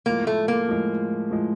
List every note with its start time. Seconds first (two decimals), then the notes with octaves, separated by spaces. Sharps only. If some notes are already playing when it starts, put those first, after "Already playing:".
0.06 A2 F3 G#3 A#3
0.27 A3
0.48 A#3
0.69 A2 F3 G#3
1.30 A2 F3 G#3